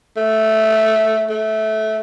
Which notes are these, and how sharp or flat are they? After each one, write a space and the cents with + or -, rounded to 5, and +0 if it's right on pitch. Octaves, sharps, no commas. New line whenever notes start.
A3 -5
A3 -15